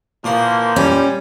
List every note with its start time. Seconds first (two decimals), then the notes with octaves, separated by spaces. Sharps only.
0.24 A#2 E3 F3 A#3 F#4 C6
0.76 G3 C#4